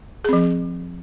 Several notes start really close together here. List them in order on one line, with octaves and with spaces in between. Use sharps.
G#4 C4 F3